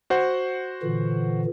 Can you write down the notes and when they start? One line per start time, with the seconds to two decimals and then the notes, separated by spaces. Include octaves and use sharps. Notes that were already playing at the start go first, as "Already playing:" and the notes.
0.10 F#4 C5 F#5
0.83 A#2 D3 E3